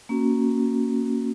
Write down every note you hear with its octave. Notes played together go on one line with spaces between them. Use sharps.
A#3 C#4 F#4